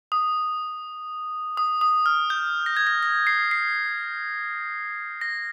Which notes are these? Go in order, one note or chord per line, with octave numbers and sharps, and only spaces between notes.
D#6
D#6
D#6
F6
G6
A#6
G#6
A#6
A#6
C7
C7
A#6